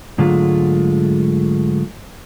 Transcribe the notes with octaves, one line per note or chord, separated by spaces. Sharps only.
G#2 D3 F#3 G#3 A3 F4